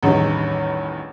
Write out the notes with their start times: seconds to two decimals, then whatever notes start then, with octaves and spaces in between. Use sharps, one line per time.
0.03 A1 E2 G2 D#3